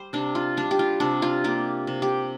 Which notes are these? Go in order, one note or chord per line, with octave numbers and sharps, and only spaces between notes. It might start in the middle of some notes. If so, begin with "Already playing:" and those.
Already playing: G3 C5
C3 D4
F4
G3 D4
G4
F4
C3 D4
F4
A#3 G4
C3
G4